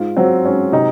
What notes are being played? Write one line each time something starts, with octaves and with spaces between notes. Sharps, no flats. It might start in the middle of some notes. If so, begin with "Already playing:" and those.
Already playing: G#2 F4
F#3 C4
G#2 C#4
C3 D#4